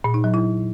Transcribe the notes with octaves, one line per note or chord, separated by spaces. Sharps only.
A#2
D#4
F#3
E4